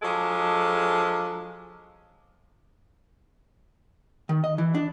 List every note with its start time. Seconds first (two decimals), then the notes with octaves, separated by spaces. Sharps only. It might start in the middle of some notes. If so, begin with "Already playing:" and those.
0.02 F3 F#3 G#3 D4 G#4 A4
4.29 D#3
4.44 D#5
4.58 E3
4.75 D4